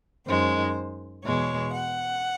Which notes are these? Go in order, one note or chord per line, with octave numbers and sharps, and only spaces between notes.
F#2 D#3 G#3 C5
E2 B2 G#3 C#5
F#5